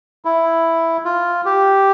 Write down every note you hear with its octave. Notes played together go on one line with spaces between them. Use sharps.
E4
F4
G4